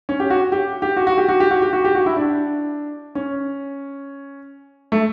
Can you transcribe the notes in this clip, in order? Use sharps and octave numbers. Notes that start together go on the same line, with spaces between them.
C#4
G4
F#4
G4
G4
F#4
F#4
G4
F#4
G4
F#4
G4
F#4
G4
F#4
E4
D4
C#4
A3